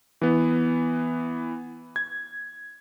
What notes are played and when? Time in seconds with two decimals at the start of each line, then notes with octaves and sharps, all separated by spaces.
0.22 E3 B3
1.96 G#6